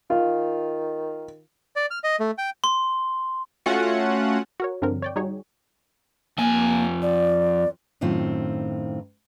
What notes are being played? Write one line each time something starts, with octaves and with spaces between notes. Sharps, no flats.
D#3 F4
D5
F6
D#5
A3
G5
C6
A3 C#4 F4 F#4 F#5
F#4 A#4 C#5
G2 D3 F3 C4 D4 A#4
C#5 D5 G5
G3 D#4 F#4 G#4 C#5
F2 A#3 G#5
D5
F#2 A2 D#3 C4 F4